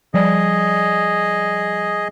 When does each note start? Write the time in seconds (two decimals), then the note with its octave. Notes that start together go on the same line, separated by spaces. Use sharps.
0.14 F3 G3 G#4 D5 D#5